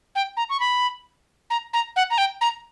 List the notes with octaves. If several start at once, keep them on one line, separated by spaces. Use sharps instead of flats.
G5
A#5
C#6
B5
A#5
A#5
F#5
A#5
G5
A#5